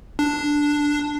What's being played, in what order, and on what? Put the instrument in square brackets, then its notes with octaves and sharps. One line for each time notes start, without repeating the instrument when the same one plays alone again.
[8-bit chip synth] D4